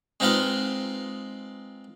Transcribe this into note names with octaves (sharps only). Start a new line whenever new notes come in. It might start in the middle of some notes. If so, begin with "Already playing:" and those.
G#3 C4 D#4 F4 B4 F5